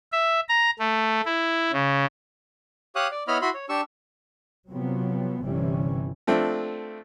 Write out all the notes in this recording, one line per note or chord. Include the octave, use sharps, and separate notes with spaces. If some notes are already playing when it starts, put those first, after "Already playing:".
E5
A#5
A3
E4
C#3
G4 C#5 F5 D#6 F#6
D5
B3 E4 C#5 D#5 B5 F6
E4 F#4 B5 C6
C#5
D4 G4 C#6 E6
C3 F3 F#3 B3 C4
G1 C3 E3 G3 C#4
F3 A3 C4 D4